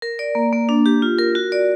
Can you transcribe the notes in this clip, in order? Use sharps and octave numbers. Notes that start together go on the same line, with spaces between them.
A#4
D5
A#3
A#3
D4
G4
F4
A#4
F#4
D5